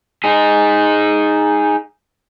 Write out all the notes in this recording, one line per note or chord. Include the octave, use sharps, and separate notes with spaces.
D#4 G#4